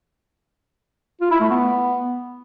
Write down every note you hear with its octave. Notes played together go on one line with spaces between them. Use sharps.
F4
E4
A3
B3